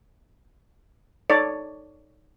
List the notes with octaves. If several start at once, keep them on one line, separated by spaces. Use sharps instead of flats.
D#4 A4 C#5 D5